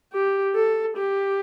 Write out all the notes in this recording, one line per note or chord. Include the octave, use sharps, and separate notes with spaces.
G4
A4
G4